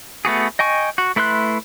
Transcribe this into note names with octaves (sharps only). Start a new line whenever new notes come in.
A3 B3 F#4 G#4
D#5 G5 G#5 C#6
F#4
A3 E4 B4 C6 F#6